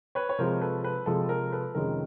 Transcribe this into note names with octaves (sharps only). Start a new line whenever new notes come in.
B4 C#5
C#5
C3 F3 G#3 A#4 C5
A4 B4
A4 B4
C3 F3 G#3 A4
A#4
A4 B4
F2 C3 D#3 G#3 C#4 A#4